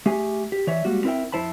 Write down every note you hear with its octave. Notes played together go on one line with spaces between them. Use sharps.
A3 G4 G#4 G#5
G4
E3 C#5 D5 E5
G3 G#3 A#3 F#4
C4 E4 A#4 D5 E5 G5
F2 E4 C5 A5 B5